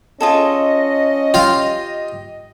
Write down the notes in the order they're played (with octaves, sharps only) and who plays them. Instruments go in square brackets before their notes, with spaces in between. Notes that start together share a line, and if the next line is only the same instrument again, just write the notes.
[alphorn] C#4 [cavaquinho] F4 G#4 A4 [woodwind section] D#5
[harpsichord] F4 F5 [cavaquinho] G4